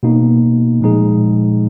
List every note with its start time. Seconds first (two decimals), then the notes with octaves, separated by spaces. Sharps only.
0.03 B2 A#3 D#4
0.81 A#2 F3 G#3 D#4 G#4